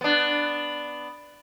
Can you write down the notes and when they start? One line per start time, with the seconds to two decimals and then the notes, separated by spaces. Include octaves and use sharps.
0.01 B3 D4